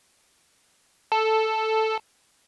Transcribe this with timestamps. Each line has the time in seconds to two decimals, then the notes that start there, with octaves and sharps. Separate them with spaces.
1.12 A4